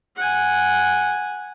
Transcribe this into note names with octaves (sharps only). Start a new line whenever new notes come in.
F#5 G#5